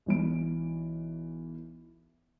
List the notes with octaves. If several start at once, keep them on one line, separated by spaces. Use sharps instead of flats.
B1 E3 D7